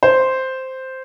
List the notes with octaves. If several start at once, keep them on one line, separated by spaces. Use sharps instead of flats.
C5